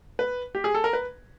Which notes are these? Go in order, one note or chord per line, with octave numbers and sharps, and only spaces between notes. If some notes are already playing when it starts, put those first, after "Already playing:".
B4
G4
G#4
A4
A#4
B4